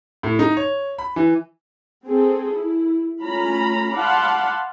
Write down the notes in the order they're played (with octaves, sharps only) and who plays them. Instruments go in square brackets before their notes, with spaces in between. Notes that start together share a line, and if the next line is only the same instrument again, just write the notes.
[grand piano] A2
D#4
C#5
B5
E3
[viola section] C4 G#4 A4
E4
A3 C#4 F4 A#5 B5
D5 F5 F#5 A5 B5 C6